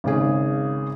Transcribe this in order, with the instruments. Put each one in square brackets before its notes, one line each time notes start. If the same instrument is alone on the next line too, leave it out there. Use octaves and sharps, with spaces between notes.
[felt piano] G#1 C#3 G#4